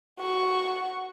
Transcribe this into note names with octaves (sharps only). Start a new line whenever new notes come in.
F#4 C#6